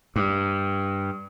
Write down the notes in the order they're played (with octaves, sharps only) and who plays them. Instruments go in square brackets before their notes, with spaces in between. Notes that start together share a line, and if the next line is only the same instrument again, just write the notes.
[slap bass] G2